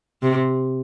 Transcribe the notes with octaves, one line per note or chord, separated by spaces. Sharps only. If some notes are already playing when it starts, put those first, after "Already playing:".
C3